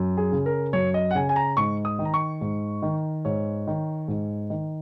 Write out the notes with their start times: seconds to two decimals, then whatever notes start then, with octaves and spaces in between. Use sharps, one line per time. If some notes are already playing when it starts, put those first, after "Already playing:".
Already playing: F#2
0.17 G#4
0.32 C#3
0.46 A#4
0.73 F#2 C#5
0.94 D#5
1.11 F#5
1.15 C#3 G#5
1.29 G#5
1.36 A#5
1.57 G#2 C#6
1.85 D#6
1.99 D#3
2.05 A#5
2.14 C#6
2.41 G#2
2.82 D#3
3.25 G#2 C#5
3.67 D#3
4.08 G#2
4.50 D#3